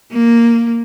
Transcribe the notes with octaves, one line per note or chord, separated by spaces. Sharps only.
A#3